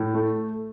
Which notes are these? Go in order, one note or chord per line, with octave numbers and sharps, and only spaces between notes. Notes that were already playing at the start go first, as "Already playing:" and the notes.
Already playing: A2
A3